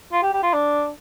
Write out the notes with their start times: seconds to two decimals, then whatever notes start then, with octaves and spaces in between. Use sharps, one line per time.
0.13 F4
0.22 G4
0.32 G4
0.43 F4
0.53 D4